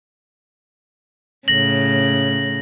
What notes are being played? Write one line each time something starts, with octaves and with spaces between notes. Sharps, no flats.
A2 C#3 A#6 F#7